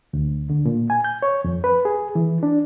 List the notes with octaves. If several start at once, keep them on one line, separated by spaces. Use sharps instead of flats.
D2
D3
A#2
G#5
G6
C#5
F2
B4
G#4
E3
D4